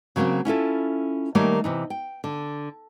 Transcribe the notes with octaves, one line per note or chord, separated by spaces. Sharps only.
C#3 F#3 A3 A#3 C4
C#4 E4 F4 A4
D#3 G3 A3 A#3 C#5
C3 E3 D#4
G5
D3